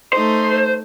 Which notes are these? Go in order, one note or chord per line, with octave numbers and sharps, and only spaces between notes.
A3 D#4 C5